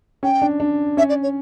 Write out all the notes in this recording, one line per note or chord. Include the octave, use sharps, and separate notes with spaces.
C#4 G5
D4
D4
C#4 E5
D5
C#5